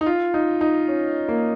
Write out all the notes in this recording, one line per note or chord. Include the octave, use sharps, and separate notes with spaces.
D#4
F4
D#4
D#4
C#4
A#3